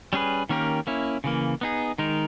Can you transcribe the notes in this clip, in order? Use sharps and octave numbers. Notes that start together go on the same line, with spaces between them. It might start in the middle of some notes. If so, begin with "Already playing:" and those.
G3 C#4 G#4 B4
D#3 A#3 C#4 G4 A#4
A#3 C#4 E4
C#3 E3 A#3
B3 D#4 G#4
D#3 G#3 D#4 A#4